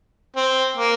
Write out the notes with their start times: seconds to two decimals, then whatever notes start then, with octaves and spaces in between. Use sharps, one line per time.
0.36 C4
0.77 A#3